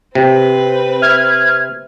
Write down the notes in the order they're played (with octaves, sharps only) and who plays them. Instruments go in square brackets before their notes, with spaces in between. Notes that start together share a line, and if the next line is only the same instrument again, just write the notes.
[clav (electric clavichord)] C3 [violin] C4 B4
[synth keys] E5 F6 G#6